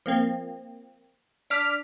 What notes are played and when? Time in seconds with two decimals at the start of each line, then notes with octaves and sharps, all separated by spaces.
0.06 F3 A#3 C4
1.50 D4 D6 F6 B6